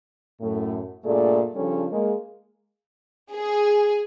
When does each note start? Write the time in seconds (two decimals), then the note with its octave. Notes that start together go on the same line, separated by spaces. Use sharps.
0.41 F#2 A2 A3
1.04 G2 A#2 A3 G#4 A4 D5
1.55 C#3 F3 G3 C#4 D4 A4
1.92 G#3 A#3
3.32 G#4